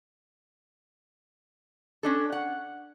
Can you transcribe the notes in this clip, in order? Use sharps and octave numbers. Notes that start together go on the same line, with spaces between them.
C#4 D4 A4
F#5